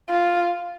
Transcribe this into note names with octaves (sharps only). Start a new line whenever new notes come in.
F4